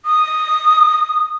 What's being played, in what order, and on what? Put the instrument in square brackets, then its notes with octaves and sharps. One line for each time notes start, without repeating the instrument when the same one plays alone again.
[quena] D#6